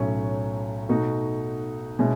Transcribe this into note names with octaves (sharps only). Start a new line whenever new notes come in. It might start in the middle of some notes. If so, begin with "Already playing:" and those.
Already playing: B1 A2 F#3 C#4
B2 A3 D#4 F#4
B2 G#3 C#4 E4